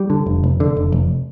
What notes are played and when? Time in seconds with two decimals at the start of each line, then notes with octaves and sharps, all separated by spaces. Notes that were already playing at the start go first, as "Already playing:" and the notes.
Already playing: G3
0.10 D3
0.26 F1
0.44 F1
0.60 D3
0.77 F1
0.92 F1